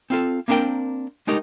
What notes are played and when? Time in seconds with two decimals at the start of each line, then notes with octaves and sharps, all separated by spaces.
0.10 C4 F4 A4
0.48 A#3 C4 D4 A#4 G5
1.27 G#3 A3 D#4 G4 A#4